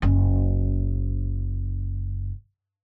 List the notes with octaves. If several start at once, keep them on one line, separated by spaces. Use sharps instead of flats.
F#1 C#4